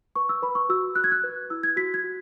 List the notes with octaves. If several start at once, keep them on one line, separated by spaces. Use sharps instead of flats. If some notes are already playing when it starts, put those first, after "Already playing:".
B4 C#6
E6
B4 B5
C#6
F#4 E6
F#4 F#6
G#6
F#6
B4
E4 E6
G#6
F#4 B6
G#6
F#4